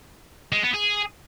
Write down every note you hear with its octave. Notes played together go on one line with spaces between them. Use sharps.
G#3
B3
G#4